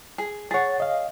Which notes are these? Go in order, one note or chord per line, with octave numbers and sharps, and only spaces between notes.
G#4
G#4 C#5 F#5 A6
D#5 F5